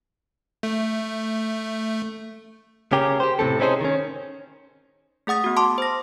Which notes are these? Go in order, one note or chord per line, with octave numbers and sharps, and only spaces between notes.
A3
C#3 C#4 G4 G#4 A#4
G4 C5
A2 C3 F3 C4 A4
C4 C#4 D#4 E4 G#4 C5
D#3 C#4
A3 G#4 F#5 D#6 A6
B3 F#4
A5 C6 D6
C5 A#6